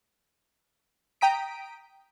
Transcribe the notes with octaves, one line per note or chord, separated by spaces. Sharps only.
G5 A#5 D#6 B6 D7